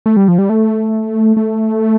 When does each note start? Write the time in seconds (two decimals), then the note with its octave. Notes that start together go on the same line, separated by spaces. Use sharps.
0.06 A3
0.17 G3
0.28 F3
0.38 G3
0.49 A3
1.37 A3